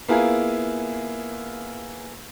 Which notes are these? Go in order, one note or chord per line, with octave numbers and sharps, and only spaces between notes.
A#3 B3 E4 F4 G#4 A#4